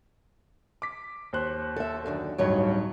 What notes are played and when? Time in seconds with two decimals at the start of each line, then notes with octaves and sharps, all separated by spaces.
0.82 D6 B6
1.33 D#2 C5 F#6
1.76 A4 E5
2.06 F#2 D3 D#3
2.38 D1 G2 F#3 D#4 C#5